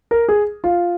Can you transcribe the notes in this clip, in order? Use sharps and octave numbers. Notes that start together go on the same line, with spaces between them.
A#4
G#4
F4